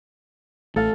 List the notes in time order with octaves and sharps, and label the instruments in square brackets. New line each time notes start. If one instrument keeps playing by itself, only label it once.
[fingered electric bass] A1 A3 [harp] A4 F5